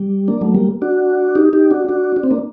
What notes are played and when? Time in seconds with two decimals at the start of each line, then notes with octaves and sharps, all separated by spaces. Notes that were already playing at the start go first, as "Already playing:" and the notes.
Already playing: G3
0.28 A#3 D4
0.41 F#3 A3
0.54 G3 A#3
0.82 D4 F#4
1.35 D#4 G4
1.53 D#4 G4
1.71 D4 F#4
1.88 D4 F#4
2.16 D4
2.24 C4
2.31 A#3 D4